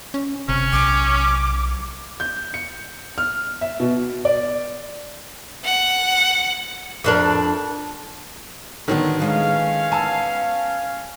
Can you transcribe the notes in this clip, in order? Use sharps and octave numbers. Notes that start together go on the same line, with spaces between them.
C#4
G1 C3 C#4
B1 D6
G6
C#7
F6
E5
B2
D5
F#5
F2 D4 A#4
D#2 D3 D#3 F#3 B3
E3 G#3 C#4 D#4 F5
B3 G#5 A5 E6